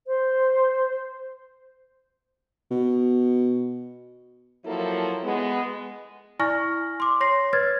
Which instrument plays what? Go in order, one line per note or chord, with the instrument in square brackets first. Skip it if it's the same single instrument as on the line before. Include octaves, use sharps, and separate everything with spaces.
[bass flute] C5
[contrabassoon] B2
[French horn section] F3 F#3 A#3 E4 A4
G#3 B3
[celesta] E4 D5 G#5 C#6 F6 A#6
C6 D6
C#5 C6 A#6 C7
B4 C#5 F6 G#6 A6